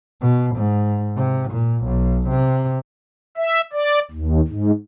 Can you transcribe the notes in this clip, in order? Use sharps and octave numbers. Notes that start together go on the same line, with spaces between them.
B2
G#2
C3
A#2
B1
C3
E5
D5
D#2
G#2